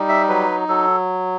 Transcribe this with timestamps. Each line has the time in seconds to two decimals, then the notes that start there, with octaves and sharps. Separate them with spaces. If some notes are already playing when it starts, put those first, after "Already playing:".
Already playing: G3 D#4
0.09 E5
0.29 F#3 B4
0.68 F#3 A4